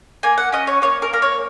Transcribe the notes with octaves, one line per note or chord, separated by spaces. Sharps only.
A#3 G#5
F#5
C#4 D#5
C#5
A#3 C#5
A#4
A#3 A#4
C#5